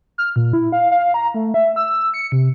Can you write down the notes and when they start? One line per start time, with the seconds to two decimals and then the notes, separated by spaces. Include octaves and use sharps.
0.18 F6
0.36 A#2
0.53 E4
0.72 F5
0.91 F5
1.14 A#5
1.34 A3
1.54 E5
1.76 E6
2.14 C#7
2.32 C3